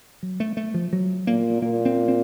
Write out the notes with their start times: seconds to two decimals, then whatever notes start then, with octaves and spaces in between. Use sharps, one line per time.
0.23 F#3
0.40 A3
0.57 A3
0.74 F3
0.93 F#3
1.27 A#2 A#3
1.62 A#2 A#3
1.85 C4
2.08 C4